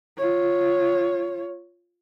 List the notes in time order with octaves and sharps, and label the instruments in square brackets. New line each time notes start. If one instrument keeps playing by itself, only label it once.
[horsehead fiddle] F4 C#5